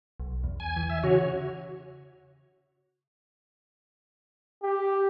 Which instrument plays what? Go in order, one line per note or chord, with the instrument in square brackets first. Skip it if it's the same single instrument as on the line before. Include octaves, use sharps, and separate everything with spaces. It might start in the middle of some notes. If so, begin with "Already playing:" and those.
[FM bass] B1
E2
[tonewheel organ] G#5
[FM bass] E3
[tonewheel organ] E5
[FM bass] C#3 [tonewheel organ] F#4 C#5
[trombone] G4